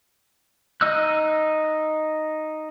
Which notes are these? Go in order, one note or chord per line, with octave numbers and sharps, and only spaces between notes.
D#4 D#5 E6 F#6